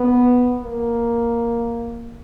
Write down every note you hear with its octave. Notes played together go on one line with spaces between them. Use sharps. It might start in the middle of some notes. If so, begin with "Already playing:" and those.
Already playing: B3
A#3